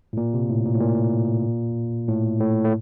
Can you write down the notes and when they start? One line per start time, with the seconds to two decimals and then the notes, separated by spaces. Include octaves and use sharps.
0.13 A2
0.17 A#2
0.34 C3
0.49 A2
0.65 A#2
0.75 A2
0.81 A#2
2.08 A2
2.40 A2
2.64 A2